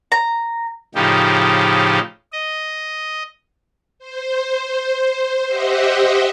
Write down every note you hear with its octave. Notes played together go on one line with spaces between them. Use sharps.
A#5
A2 C#3 F3 D#4 G4
D#5
C5
G4 C5 D#5 E5 F#5